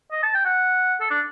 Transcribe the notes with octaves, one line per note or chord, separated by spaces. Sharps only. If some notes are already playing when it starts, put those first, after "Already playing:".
D#5
A5
G5
F#5
A4
D4